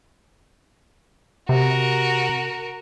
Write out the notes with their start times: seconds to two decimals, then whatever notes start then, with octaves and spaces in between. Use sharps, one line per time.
1.49 C3 F#4 A#4